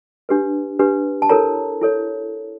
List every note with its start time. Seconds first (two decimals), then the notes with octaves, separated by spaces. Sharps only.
0.29 D4 G4 B4
0.79 D4 G4 B4
1.22 A5
1.29 E4 A4 A#4 C#5 A#5
1.81 E4 A4 C#5